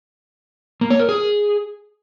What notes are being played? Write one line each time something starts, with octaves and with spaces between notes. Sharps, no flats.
A#3
C#5
A#4
G#4